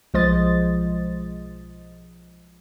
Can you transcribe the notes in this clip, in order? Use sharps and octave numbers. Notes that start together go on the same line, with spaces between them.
B1 F3 G#3 C5 D#5 A6